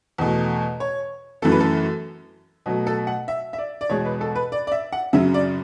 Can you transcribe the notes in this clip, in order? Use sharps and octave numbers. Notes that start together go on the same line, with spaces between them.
E2 B2 A3
C#5
F#2 E3 A3 A4
B4
A4
B2 F#3 A3
A4
F#5
E5
E5
D5
D5
E2 B2 G#3 C#5
B4
A4
B4
D5
D5
E5
F#5
F#2 C#3 F#3 E5
D5